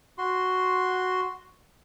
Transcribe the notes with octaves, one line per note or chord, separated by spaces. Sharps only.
F#4 C6